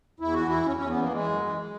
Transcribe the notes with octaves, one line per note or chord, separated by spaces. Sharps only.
E2 E4
E3 F#4
E2 E4
E2 C#4
E2 C#4
B3
E3 A#3
E3 G#3
F#2
E3
G#3